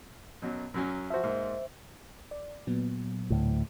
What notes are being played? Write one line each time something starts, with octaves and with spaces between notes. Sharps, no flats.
F#2 B2 F#3
F#2 F#3 C#4
F3 F#4 C5 E5
G#2 A#3
D5
A#2 F#3 B3
D2 A2